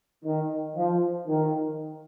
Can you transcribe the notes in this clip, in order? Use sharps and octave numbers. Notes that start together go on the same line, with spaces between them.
D#3
F3
D#3